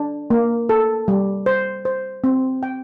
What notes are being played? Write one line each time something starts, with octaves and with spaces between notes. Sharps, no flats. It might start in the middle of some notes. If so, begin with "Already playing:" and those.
Already playing: D4
A#3
A4
G3
C5
C5
C4
G5